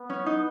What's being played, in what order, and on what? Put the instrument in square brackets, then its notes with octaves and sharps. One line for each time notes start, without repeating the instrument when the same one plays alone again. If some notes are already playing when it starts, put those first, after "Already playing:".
Already playing: [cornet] B3
[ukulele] C#4
D#4